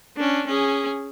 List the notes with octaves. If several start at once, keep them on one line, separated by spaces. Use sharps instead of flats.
C#4 D4
C#4 G#4